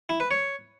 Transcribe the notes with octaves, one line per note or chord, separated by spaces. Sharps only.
E4
B4
C#5